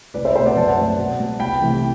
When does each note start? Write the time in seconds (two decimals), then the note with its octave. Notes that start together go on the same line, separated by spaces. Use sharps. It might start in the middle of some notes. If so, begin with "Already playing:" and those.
0.14 C2 B4 D5
0.25 C5 E5
0.35 B2 A3 C4 C5 E5
0.45 D5 F#5
0.56 F#2 F#5 A5
0.77 F#3 A3 C4
0.98 B2
1.19 G3 B3
1.40 C2 G5 B5
1.60 C3 E3 A3